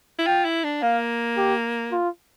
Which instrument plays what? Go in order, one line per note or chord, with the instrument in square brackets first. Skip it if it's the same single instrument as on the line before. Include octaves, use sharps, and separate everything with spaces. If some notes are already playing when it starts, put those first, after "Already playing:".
[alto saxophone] E4
[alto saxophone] F4 [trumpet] G5
[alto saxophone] E4
D4
[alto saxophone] A#3 [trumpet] F5
[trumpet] G4
F4